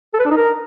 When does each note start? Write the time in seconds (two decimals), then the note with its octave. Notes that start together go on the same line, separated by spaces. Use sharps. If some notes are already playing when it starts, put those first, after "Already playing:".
0.14 A4
0.19 B4
0.25 D4
0.31 D#4
0.37 A#4